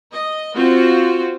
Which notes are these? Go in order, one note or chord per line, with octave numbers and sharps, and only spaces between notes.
D#5
C4 F4 F#4